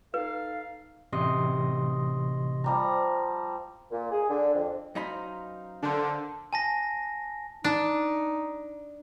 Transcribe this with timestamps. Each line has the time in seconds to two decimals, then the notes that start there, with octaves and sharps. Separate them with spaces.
0.14 D#4 A4 B4 F5
1.12 A1 C3 D#5 C6
2.64 F3 G3 A#5
3.91 A#2
4.11 G#4
4.29 D3
4.53 F2
4.95 F#2 D#4 C5 F5 A#5 B5
5.82 D3 A4 A#4 C5
6.53 G#5 A5 A#6
7.64 D4 D#4